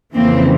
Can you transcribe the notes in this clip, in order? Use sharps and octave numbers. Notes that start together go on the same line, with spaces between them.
F2 C#3 E3 A#3 C4